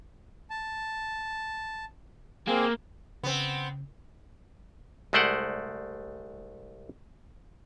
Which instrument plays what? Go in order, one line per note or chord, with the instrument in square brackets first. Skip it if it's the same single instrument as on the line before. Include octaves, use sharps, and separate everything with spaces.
[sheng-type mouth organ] A5
[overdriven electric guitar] A#3 [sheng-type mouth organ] C4 G#4
[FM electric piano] C#3 [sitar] B3 C4
[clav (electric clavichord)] C2 G#3 A3 C5 D5 F#5